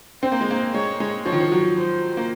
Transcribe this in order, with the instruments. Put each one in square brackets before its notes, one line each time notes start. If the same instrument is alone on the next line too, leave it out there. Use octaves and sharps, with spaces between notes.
[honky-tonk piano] C4 [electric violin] C5
[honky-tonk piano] A#3
G#3
A#3
[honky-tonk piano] G#3 [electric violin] C#5
[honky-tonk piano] G#3
[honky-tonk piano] F3 [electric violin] C#5
[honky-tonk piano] D#3
F3
F#3
[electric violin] C5
[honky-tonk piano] A#3